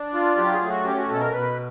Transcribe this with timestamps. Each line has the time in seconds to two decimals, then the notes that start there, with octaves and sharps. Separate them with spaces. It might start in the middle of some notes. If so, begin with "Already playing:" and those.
Already playing: D4
0.14 F4
0.37 F#3 G4
0.53 G#4
0.62 A3
0.69 F#4
0.85 C#4 G4
0.97 F#4
1.09 B2 A4
1.21 A#4
1.33 B2 B4